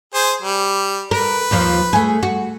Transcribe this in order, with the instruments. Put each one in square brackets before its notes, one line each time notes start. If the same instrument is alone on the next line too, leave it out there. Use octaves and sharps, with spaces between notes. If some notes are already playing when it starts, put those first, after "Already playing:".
[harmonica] G#4 C5
G3
[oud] A#4 [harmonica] B4
[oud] D#2 D#3 F3
A3 G#4
F#4